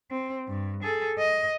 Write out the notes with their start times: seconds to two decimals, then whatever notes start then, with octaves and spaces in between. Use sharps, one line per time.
0.11 C4
0.48 G2
0.83 G#4 A4
1.18 D#5